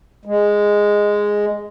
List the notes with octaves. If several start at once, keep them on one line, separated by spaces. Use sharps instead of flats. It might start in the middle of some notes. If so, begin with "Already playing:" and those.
G#3